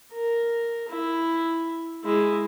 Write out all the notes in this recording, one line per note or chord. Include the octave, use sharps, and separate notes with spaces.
A#4
E4
G#3 E4